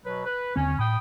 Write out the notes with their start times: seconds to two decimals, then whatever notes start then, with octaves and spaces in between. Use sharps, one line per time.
0.06 B2 F#3 B4
0.25 B4
0.56 D#2 D3 C4 C#4
0.79 A2 G5 B5 D#6